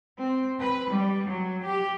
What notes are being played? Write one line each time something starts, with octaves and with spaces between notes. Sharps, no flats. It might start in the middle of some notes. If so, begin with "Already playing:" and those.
C4
B4
G3
F#3
G4